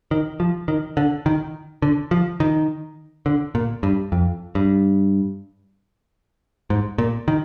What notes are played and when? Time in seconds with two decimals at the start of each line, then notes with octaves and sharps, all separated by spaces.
0.11 D#3
0.40 F3
0.68 D#3
0.97 D3
1.26 D#3
1.82 D3
2.11 F3
2.40 D#3
3.26 D3
3.55 A#2
3.83 G2
4.12 F2
4.55 G2
6.70 G#2
6.98 A#2
7.28 D#3